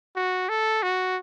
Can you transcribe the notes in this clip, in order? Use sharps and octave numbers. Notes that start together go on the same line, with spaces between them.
F#4
A4
F#4